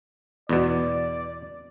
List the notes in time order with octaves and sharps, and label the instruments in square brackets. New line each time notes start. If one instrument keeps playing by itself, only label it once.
[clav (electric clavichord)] E2 B2 [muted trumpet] D5